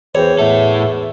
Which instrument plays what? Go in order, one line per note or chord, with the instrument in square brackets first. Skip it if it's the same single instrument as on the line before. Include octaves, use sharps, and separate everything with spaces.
[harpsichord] E2 [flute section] F#4 C5 G5 [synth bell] C#5
[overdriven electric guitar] A2 A4 [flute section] E5 F#5